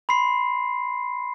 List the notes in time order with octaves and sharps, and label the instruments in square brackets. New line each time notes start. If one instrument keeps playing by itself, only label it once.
[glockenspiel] B5 C6 C7